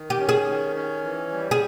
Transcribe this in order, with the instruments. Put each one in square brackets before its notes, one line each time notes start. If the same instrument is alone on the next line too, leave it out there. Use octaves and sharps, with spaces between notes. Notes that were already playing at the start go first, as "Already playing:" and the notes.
Already playing: [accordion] D#3
[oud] G4
[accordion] C#4
[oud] G#4
[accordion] D#3
C#4
E3
G3
[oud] G#4